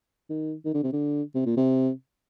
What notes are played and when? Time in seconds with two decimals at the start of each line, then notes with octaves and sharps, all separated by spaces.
0.29 D#3
0.65 D#3
0.74 D3
0.83 C3
0.93 D3
1.35 C3
1.46 A#2
1.57 C3